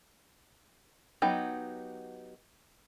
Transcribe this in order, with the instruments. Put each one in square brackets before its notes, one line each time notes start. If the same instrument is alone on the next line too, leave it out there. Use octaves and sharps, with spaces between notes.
[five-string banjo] F#3 B3 D#4 G4